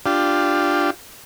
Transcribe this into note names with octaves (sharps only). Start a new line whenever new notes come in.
D4 F4 G4